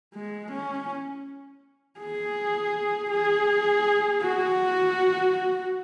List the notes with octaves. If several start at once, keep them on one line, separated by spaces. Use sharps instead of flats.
G#3
C#4
G#4
G#4
F#4